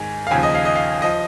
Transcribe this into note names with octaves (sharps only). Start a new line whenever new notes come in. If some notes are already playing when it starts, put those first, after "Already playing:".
Already playing: G#2 D#3 G#5
F5
D#2 C#3 F3 G#5
D#5
F5
D#5
F5
F3 D#5